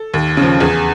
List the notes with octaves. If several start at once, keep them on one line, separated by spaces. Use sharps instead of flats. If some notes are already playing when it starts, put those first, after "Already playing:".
Already playing: A4
D#2
C#3 F3
E2 G#4